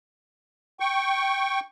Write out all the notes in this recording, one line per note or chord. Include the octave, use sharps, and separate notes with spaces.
G5 C#6